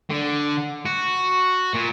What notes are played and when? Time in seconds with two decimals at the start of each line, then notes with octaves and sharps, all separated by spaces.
0.10 D3
0.86 F#4
1.74 A#2